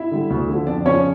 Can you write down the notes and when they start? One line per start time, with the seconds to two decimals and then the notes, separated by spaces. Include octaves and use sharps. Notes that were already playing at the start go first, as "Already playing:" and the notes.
Already playing: E4 E5
0.11 D3 G3
0.30 D2
0.48 D3 F3
0.67 F2 D4 D5
0.86 C#3 F3 C#4 C#5